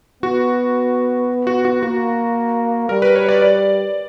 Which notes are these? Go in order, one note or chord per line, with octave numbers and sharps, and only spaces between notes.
B3 F#4
F#4
F#4
A#3 F#4
G3 A#4
B4
C#5
D5
D5